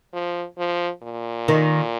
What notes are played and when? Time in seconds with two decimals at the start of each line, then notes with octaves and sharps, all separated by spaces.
0.13 F3
0.58 F3
1.03 A#2
1.48 D#3